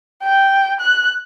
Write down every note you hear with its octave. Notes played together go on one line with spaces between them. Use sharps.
G5
F#6